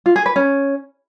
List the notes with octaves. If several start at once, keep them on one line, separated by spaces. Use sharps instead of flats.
F4
G#4
B4
C#4